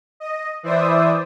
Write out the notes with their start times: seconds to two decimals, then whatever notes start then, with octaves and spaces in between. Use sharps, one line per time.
0.20 D#5
0.63 E3 E4 C5 D5 E5 D#6